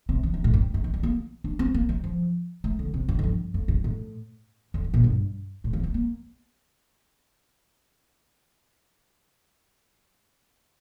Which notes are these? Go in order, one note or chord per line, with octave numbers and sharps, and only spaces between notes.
C3
D#3
D3
A2
G2
G2
D#3
G3
A#3
D4
C4
A#3
G3
F3
A3
D3
C3
G2
F2
G2
F2
G2
A2
F2
G2
A#2
G2
A2
F3
G3
A#3